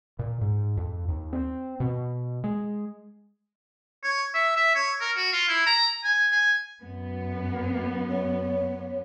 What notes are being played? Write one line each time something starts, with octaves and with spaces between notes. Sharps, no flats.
A#2
G#2
F2
D#2
C4
B2
G#3
C#5
E5
E5
C#5
A#4
F#4
F4
E4
A#5
G#5
G#5
F#2 B3
C#5